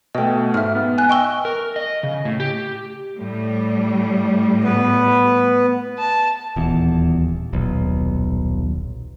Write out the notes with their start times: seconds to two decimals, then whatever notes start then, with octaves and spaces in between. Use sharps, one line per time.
0.15 B2 A3 D#5 G5
0.54 G#2 E5 F6
0.75 B3
0.98 G#5 F#6
1.10 D#5 G5 C#6 E6 G7
1.45 A#4
1.76 D#5
2.03 C#3
2.25 A2
2.40 G4
3.16 A2 G3
4.64 B3 B4
5.99 A5
6.56 D#1 E2
7.53 D#1 B1